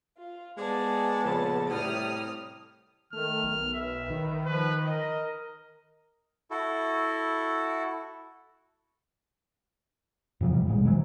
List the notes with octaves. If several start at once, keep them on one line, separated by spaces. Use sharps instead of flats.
F4
G#3 B3 G#4 D5 A5
F2 A#2 C#3
A2 C3 G3 D#6 F6
D#3 A3 F6
B1
B4 E5
D#3
F3 B4
A#4 D#5
E4 F#4 A4
F2 C3 F3 F#3
C3 E3 G3
D#1 A1 B2 G#3
D#3 E3 F#3